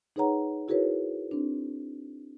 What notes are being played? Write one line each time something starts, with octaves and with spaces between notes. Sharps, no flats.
D#4 G#4 B4 C#5 F#5 A#5
E4 F#4 G#4 A#4 B4 C#5
C4 D4